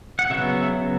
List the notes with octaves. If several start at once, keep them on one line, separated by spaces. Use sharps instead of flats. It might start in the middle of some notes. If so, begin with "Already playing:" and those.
F#5
C#3 F#3 B3 E5